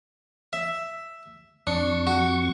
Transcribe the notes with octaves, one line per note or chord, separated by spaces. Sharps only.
E5
F2 D4 C#6
F#4